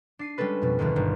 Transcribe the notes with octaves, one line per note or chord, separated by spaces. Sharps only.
D4 C7 D#7
G3 G#3 C#4 A4 B4
F2 B2
D2 B2 D3 D#3 G#3
G1